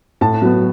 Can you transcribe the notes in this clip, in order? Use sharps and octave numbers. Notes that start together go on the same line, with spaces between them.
A2 A5
F#3 B3